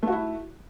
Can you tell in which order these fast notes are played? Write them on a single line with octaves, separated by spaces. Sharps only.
A3 F#4 E4